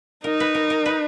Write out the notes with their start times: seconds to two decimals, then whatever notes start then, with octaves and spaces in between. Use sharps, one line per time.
0.24 D#4 A#4
0.40 B4
0.55 A#4
0.70 A#4
0.86 B4